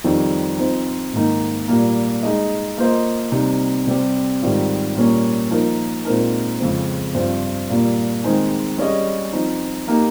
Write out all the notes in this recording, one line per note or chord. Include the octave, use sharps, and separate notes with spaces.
F2 D#3 G3 C4 D#4
F3 C4 D#4
G#2 D#3 A#3 D#4
A#2 G3 A#3
G#3 D#4 G#4 D#5
A#3 F4 C5 D#5
C3 G3 C4 D#4
C3 G3 C4 G4
G#2 D#3 G3 C4 F4
A#2 G3 A#3 C#4
F3 A#3 D#4 A#4
A#2 G#3 C4 D#4 A#4
F2 C#3 F3 G#3 C4
G2 F3 C4
A#2 G3 A#3
D#3 G#3 C4 D#4 G#4
G3 C#4 G#4 D#5
F3 C4 D#4
A#3 D#4 G4